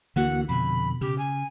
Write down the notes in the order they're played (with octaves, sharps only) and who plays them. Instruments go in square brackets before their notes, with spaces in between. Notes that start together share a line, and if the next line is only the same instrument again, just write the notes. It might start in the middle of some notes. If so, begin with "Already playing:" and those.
[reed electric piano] D2 A#3 F#4 [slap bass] D3 E3 [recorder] F#5
[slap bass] F2 D3 [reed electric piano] B2 [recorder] B5
[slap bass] C#3 [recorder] G4
[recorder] G#5